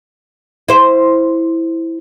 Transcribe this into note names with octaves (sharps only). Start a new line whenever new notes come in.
E4 C5